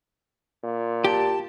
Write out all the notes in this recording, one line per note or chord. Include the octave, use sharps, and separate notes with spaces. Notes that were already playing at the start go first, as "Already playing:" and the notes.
A#2
G4 A5